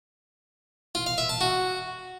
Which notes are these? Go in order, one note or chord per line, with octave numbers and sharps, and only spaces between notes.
F4
F5
E5
A5
F#4